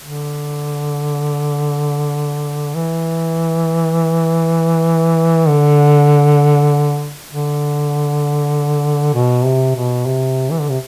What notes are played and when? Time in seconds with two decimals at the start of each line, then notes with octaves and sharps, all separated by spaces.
0.01 D3
2.75 E3
5.49 D3
7.32 D3
9.14 B2
9.45 C3
9.75 B2
10.06 C3
10.51 E3
10.60 D3
10.69 C3